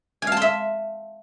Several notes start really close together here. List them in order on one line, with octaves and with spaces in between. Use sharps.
G#5 F5 A5 C6 E5